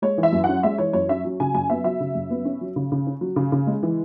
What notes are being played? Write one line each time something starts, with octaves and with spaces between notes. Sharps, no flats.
G#3 C#5
E3
E5
F#2
C#4 F#5
G#3 E5
E3 C#5
F#2 C#5
C#4 E5
F#3
C#3 G#5
F#2 G#5
B3 E5
F#3 E5
C#3
F#2
B3
C#4
F#3
C#3
C#3
C#4
F#3
C#3
C#3
G#3
E3